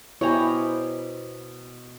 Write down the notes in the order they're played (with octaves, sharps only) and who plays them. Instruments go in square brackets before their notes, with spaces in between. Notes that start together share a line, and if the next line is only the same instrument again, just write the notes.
[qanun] B2 A#5 [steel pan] E4 G4 G#5 [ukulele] C5 C#5